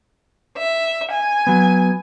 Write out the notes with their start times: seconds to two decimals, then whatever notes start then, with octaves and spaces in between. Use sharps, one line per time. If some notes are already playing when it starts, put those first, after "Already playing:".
0.57 E5
1.11 G#5
1.47 F#3 B3